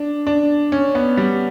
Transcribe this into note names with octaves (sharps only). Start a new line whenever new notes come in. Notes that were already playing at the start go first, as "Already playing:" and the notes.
Already playing: D4
D4
C#4
B3
G3